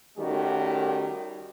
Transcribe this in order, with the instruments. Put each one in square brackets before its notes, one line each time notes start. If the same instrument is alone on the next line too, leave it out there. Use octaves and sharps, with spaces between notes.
[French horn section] D#3 G3 A3 C#4 F#4 G4